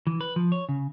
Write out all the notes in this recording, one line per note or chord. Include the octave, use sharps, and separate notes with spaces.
E3
B4
F3
C#5
C#3